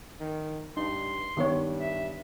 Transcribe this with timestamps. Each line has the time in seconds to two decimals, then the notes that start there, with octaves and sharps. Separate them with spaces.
0.20 D#3
0.77 G2 D#4 C6
1.37 G2 D#3 B3 C#5
1.79 E5